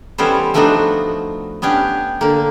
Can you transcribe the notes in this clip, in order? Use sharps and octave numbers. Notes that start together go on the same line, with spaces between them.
E3 G3 B3 C#4 A4 C5
F3 A3 B3 D4 D#4 F#4
B3 C#4 D4 G4
D3 A#3